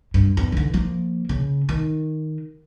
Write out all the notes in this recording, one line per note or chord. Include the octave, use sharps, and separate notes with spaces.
G2
E2
D3 E3
F3 A#3
C#3
D#3